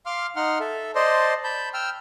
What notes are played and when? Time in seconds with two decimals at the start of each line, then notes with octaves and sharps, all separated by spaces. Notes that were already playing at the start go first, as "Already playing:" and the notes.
0.06 F5 C6 D6 F6
0.36 D#4 F#5 C6 F6
0.60 A4 E5
0.95 C5 D5 D#5 A5 C6
1.44 A5 B5 G6
1.74 G5 E6 F6